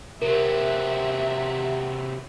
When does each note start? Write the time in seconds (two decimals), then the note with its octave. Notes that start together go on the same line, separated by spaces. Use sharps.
0.22 C3 F#3 G4 A#4 E5